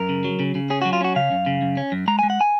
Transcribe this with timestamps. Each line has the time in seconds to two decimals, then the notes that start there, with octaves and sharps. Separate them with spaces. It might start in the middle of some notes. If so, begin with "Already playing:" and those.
Already playing: F#2 A#4
0.09 C#3
0.24 F#3
0.40 C#3
0.55 C#3
0.70 C#4 G#4
0.82 F#4
0.85 F#3
0.93 F4
1.01 C#4 F#4
1.16 C#3 F5
1.32 F#2
1.46 C#3
1.62 F#2
1.77 C#4
1.92 F#2
2.08 G#3 A#5
2.19 G#3 G#5
2.30 F#5
2.41 G#5